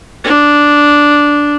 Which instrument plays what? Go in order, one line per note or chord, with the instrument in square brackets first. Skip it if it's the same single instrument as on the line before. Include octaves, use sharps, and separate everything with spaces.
[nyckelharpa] D4